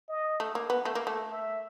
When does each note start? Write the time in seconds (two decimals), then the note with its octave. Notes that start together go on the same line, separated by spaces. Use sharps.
0.09 D#5
0.40 A3
0.55 A#3
0.70 B3
0.85 A3
0.95 A#3
1.07 A3
1.31 E5